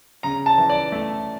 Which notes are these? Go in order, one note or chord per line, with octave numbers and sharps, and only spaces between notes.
C#3 A#5
A5
E3
D5
A3